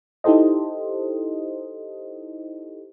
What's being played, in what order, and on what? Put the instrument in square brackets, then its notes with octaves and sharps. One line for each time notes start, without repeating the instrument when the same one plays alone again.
[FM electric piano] D#4 E4 G4 A4 C5 D#5